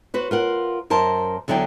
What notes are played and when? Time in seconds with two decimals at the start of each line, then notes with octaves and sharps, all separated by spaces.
0.14 F#4 B4 C5
0.31 F4 A#4 F#5
0.90 F#2 A#4 C5 A5
1.48 E2 D3 F#3 D5 G5